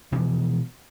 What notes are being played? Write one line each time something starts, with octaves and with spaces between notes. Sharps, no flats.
B2 E3 F3 G#3